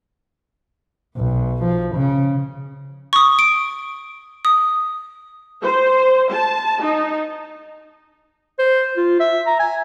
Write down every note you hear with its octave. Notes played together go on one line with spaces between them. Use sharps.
B1
F3
C#3
C#6 D#6
D7
D#6
C5
A5
D#4
C5
F4
E5
A#5
G#5